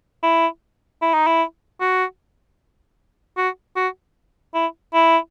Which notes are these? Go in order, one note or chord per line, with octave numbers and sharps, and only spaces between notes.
E4
E4
D#4
E4
F#4
F#4
F#4
E4
E4